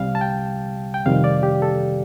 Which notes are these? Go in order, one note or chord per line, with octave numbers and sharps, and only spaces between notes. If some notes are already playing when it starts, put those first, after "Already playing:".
Already playing: C2 C3 G3 F5
A5
G5
G5
F2 C3 D#3 G3 F5
D5
G4
A4